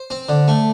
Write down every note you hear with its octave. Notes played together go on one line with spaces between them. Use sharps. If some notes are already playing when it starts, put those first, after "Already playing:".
Already playing: C5
C4
D3
A3